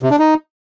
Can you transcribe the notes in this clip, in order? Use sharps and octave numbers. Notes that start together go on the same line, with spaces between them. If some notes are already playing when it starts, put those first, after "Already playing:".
C3
D4
D#4